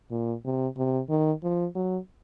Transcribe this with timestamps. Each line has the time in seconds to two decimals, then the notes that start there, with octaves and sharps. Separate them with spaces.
0.11 A#2
0.45 C3
0.77 C3
1.09 D#3
1.43 F3
1.75 F#3